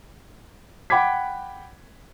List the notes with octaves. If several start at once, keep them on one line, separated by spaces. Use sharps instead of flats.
F#5 G5 B5 D6 G#6 B6